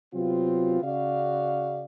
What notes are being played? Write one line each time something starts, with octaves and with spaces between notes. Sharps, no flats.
C3 F#3 B3 C4 F4
C#3 F#4 D5 F5